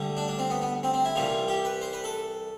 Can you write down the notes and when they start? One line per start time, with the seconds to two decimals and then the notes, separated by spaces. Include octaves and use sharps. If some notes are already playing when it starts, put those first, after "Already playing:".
Already playing: D2 D3 G3
0.17 D4
0.28 D4
0.38 C4
0.50 B3
0.61 B3
0.83 C4
0.94 C4
1.05 E4
1.15 C2 C3 E3 G3 F4
1.48 G4
1.65 B4
1.82 C5
1.93 B4
2.04 A4